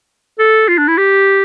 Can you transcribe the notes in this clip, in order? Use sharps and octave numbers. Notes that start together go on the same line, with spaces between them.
A4
F4
D4
E4
G4